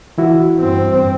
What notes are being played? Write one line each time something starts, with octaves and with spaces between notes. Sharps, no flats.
E3 E4 F#4
G2 C4